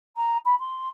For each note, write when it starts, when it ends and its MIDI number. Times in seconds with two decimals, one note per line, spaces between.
0.16 0.37 82
0.45 0.55 83
0.59 0.88 84